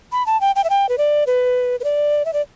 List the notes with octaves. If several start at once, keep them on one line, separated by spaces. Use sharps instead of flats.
B5
A5
G5
G5
E5
G5
B4
D5
B4
B4
D5
E5
D5